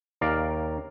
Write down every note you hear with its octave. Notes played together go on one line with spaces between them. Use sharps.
D#2 A#4 D5 F5